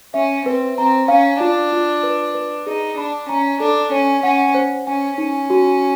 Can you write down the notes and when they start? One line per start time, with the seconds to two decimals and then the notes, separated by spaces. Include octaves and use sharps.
0.14 C#4 E5
0.46 C4 B4
0.78 C4 A#5
1.08 C#4 F5
1.40 D4 F4
1.72 F4
2.03 B4
2.34 B4
2.66 D#4 G#4
2.98 D4 B5
3.29 C#4 A#5
3.60 D4 A4
3.91 C#4 C#5
4.23 C#4 F#5
4.54 C5
4.87 C#4 G#5
5.18 C#4 D#4
5.50 F#4